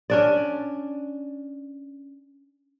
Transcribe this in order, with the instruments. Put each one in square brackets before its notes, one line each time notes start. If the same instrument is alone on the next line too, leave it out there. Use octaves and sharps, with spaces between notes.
[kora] C#4 D4 D5